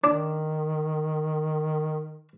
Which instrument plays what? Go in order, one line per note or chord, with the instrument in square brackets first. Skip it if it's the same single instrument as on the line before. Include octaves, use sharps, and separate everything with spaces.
[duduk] D#3 [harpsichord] D4